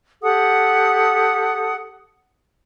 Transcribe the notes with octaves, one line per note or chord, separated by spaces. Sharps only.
G4 A4 F#5 D#6